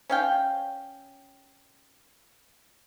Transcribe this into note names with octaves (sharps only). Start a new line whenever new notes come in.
C#4 F5 G5